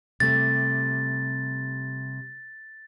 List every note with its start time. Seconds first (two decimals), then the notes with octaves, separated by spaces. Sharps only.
0.20 C3 G3 A3 A6